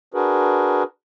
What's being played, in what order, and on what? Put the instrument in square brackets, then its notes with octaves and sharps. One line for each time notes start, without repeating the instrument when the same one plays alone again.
[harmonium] D4 F#4 G#4 A#4 B4